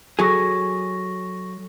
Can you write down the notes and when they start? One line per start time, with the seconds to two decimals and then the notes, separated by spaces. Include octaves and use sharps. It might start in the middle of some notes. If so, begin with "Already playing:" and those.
0.19 F#3 G#4 A4 C#6 A#6